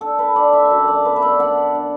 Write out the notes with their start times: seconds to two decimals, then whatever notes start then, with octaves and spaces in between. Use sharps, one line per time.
0.01 D4 A4
0.19 B4
0.36 D3 D5
0.53 E5
0.65 E5
0.70 F#2 D5
0.88 D5
1.05 B3 B4
1.16 E5
1.22 D5
1.40 D4 F#5
1.75 D4